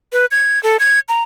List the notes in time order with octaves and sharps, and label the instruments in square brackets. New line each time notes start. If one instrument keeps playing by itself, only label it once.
[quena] B4
G#6
A4
G#6
A#5